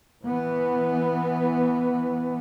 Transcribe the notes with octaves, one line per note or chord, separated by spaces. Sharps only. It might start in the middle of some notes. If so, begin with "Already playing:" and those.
E3 B3